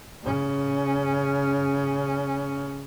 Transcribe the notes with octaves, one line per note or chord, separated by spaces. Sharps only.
C#3 C#4